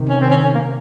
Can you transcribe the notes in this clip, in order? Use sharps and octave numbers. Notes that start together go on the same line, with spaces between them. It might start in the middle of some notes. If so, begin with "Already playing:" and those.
Already playing: C3 D#3
C#4
C4
C#4
C#4
A#3